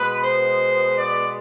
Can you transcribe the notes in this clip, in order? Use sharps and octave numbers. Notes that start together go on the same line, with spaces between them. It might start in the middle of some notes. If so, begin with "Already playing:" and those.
Already playing: B2 G#3 B3 B4
C5
D5